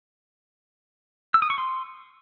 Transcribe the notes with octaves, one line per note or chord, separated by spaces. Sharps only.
E6
D#6
C#6
C6